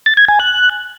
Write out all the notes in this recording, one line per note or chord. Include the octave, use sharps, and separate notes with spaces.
A6
G#6
G#5
F#6